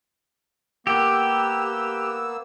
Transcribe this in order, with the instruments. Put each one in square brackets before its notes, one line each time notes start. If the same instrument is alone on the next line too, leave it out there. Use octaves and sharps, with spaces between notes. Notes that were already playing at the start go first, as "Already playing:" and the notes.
[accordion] A#3 B3 E6 [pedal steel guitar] G4